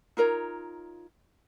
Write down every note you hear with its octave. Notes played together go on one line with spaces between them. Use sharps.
D#4 F4 A#4 C#5